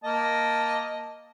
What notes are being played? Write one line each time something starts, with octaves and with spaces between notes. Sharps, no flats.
A#3 D#5 A5